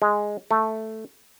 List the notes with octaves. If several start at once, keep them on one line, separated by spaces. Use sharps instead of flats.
G#3
A3